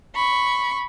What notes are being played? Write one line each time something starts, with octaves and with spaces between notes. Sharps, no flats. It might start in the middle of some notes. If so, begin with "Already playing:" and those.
B5 C#6